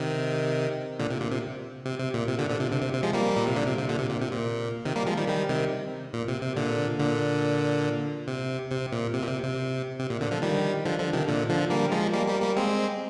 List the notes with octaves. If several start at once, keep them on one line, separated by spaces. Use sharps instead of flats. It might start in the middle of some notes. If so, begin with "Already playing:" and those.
Already playing: C3 D#3
A#2 D3
C3
A#2
C3
C3
C3
A#2
C3
A#2 D3
A#2 D3
C3
C3
C3
C3
F3 G#3
G3 A#3
A#2
C3
A#2 D3
C3
C3
A#2 D3
C3
A#2
C3
A#2
C3 D#3
G3 A#3
F3 G#3
D#3 G3
D#3 G3
C3 D#3
A#2
C3
C3
A#2 D3
A#2 D3
C3
C3
A#2
C3
A#2
C3
C3
C3
A#2
A#2 D3
D3 F3
D#3 G3
D3 F3
D3 F3
C3 D#3
A#2 D3
D3 F3
G3 A#3
F3 G#3
G3 A#3
G3 A#3
G3 A#3
G#3 C4